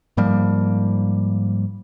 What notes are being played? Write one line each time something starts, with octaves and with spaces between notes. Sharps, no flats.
G#2 F3 G3 A#3